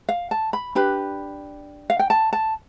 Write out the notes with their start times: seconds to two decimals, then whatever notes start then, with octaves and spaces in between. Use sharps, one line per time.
0.09 F5
0.31 A5
0.53 B5
0.75 D4 G4 B4 B5
1.90 F5
1.99 G5
2.10 A5
2.33 A5